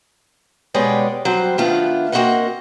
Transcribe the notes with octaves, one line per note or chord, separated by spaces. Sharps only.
B2 G#3 B3 G4 C#5 D5
F#3 G3 C4 C5
D#3 A3 B3 D4 F4
A#3 C4 F#4 A#4 D#5 F#5